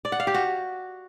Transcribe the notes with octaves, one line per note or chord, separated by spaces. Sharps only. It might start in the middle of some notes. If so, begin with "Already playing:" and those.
D5
F#5
F5
G4
F#4